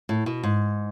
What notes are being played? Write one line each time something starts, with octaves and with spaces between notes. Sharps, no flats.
A2
B2
G#2